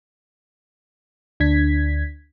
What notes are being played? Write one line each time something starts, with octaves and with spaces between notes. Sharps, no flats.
D2 D4 G#6 B6